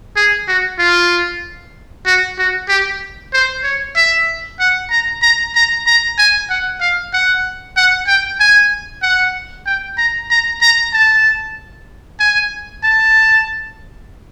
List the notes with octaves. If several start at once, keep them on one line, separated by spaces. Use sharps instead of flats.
G#4
F#4
F4
F#4
F#4
G4
C5
C#5
E5
F#5
A#5
A#5
A#5
A#5
G#5
F#5
F5
F#5
F#5
G5
G#5
F#5
G5
A#5
A#5
A#5
A5
G#5
A5